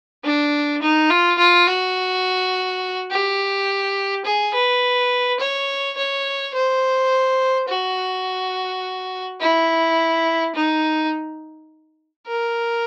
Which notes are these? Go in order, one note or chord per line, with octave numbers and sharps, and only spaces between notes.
D4
D#4
F4
F4
F#4
G4
G#4
B4
C#5
C#5
C5
F#4
E4
D#4
A#4